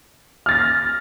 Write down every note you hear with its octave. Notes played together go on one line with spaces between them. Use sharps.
F6 A6 A#6